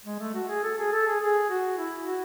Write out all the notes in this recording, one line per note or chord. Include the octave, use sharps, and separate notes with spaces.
G#3
A3
F#4
G#4
A4
G#4
A4
G#4
G#4
F#4
E4
F#4